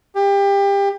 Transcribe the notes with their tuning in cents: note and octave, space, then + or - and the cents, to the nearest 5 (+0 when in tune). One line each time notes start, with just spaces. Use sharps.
G4 +25